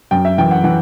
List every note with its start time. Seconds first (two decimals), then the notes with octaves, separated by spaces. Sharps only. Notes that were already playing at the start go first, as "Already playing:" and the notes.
0.11 F#2 G5
0.25 E5
0.38 E3 G5
0.51 F#5
0.64 E3 F#5